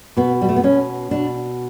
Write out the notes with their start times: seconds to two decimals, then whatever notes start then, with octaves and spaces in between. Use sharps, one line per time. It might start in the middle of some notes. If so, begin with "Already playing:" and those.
0.17 B2 B3
0.42 G3
0.49 A3
0.56 B3
0.63 B2 C#4
1.11 B2 D4